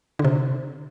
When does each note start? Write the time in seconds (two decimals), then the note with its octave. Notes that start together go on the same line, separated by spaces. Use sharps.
0.19 D3
0.25 C3